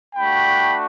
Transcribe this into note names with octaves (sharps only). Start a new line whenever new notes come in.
A3 D4 F#4 G5 B5